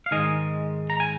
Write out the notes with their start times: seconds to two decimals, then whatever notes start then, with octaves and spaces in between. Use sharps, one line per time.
0.06 F5
0.11 G#2 D#3 G#3 D#5 G#5
0.90 A#5
1.00 G#5